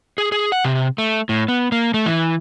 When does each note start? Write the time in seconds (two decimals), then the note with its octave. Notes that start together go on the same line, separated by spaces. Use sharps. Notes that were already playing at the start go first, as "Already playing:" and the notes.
0.18 G#4
0.32 G#4
0.52 F#5
0.64 C3
0.98 A3
1.29 A2
1.48 B3
1.72 A#3
1.94 A3
2.06 E3